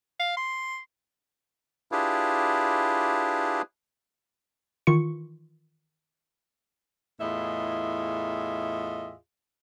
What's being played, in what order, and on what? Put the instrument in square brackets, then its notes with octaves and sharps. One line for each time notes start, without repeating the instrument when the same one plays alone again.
[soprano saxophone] F5
C6
[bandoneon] D4 E4 F4 G4 G#4 B4
[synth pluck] D#3 E3 F4 C#6 C#7
[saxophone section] E2 A2 F4 G#4 D#5 E5